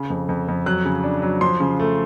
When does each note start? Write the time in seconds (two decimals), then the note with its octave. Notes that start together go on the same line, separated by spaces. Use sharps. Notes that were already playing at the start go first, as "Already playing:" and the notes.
Already playing: C#3
0.10 F2
0.29 F2
0.48 F2
0.66 F#3 F#6
0.85 C#3
1.03 D4
1.22 F#3
1.41 F3 C6
1.60 C#3
1.79 A3